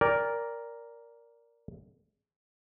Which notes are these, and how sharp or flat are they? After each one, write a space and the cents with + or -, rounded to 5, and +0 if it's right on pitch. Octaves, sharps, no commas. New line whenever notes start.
A#4 +0 D5 -15 G5 +35